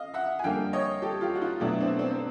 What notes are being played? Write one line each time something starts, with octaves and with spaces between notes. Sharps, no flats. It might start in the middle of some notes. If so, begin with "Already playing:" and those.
Already playing: D#5 F5
E5 F#5
G#5
F2 D3 G3 A#3 F5 G5
C#5 D#5
G4 A4
F4 G4
F#4
D#4 F4
B2 F#3 A3 D4 E4
C4 D4
C4 D4
C4